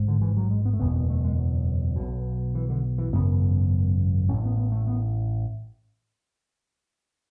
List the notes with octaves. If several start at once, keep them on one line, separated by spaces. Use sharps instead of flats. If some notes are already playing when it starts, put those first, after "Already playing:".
Already playing: A1 G#2
D3
E3
F#3
G#3
B3
A3
F#1 E2 B2 B3
B3
A3
G#3
F#3
B1 B2
E3
D3
E3
G#1 F#2 C#3 B3
A1 A2 C#4
B3
B3
A3
B3